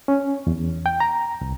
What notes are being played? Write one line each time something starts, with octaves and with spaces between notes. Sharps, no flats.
C#4
E2
G5
A#5
C2